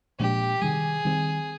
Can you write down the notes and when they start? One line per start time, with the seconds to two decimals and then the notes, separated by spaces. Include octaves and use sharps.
0.19 A#2 F3 G#3 D4 G4
0.62 C3 D#3 G3 G#4
1.05 D#3 G3 C4